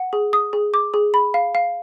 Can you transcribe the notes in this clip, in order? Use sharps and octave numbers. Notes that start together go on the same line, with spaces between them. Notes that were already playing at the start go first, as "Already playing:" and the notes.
Already playing: F#5
G#4
D#6
G#4
D6
G#4
B5
F5
F5